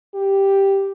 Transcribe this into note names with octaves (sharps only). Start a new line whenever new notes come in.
G4